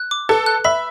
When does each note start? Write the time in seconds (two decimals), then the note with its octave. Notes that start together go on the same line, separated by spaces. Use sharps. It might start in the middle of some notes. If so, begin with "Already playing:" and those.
Already playing: F#6
0.11 D6
0.29 A4 B4
0.46 F#6
0.64 E5 B5